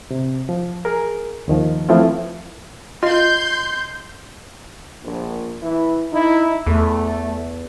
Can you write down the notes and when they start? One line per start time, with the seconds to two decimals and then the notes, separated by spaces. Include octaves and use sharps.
0.11 C3
0.49 F3
0.85 G#4 A#4
1.48 D#2 D#3 F3
1.89 E3 F3 A3 C4 E4 F4
3.03 F4 D#5 C6 G6
5.02 A#1
5.62 E3 E4
6.12 D#4 E4
6.66 E2 A3